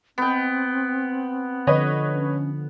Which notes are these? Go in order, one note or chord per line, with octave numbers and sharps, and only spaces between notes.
B3 C4 G5
D3 F3 B4 C#5 D#5
C#4